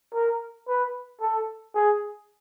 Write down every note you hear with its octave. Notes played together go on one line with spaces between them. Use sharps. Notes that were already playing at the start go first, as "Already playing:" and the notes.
A#4
B4
A4
G#4